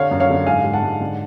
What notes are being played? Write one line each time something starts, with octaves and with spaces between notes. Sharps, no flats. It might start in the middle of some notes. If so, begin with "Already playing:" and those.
Already playing: D3 C#5 F5
F#2
C#5 F5
D3
G#2 F5 G#5
G#2
F#5 A5
G#2
D3